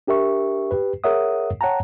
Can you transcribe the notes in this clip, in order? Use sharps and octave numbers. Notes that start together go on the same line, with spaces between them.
D4 G4 A#4 E5 C#6
G4 B4
G#4 A#4 C#5 E5 F#5 D#6
C#5 F#5 G5 A5 A#5